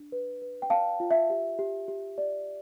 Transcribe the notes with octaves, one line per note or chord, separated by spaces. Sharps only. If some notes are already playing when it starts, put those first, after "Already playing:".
Already playing: D4
B4
B4
G5
D5 F5 A5
F4
E5
G4
G4
G4
D5